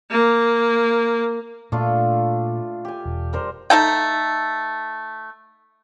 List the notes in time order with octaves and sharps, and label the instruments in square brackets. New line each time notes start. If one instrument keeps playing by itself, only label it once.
[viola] A#3
[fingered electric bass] A#2 A#3 [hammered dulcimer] A3 D4 F4
[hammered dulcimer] G4 G#5
[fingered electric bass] E1
[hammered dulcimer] G3 A#4 C5
[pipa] A3 D#4 A4 G5